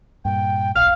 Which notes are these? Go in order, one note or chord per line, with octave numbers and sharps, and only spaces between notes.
G2 A#2 G5
D#1 B1 F5 F6